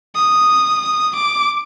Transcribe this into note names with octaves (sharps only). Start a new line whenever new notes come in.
D#6
D6